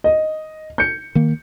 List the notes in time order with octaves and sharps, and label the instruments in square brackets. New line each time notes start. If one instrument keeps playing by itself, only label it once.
[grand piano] D#5
G6 C#7
[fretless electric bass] D#3 A#3